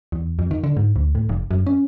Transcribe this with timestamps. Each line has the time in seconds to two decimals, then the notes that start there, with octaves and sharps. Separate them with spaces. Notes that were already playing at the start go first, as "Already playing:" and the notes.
0.12 E2
0.39 F2
0.51 D#3
0.64 D3
0.77 G#2
0.96 D2
1.15 A2
1.29 F1
1.51 F#2
1.67 C#4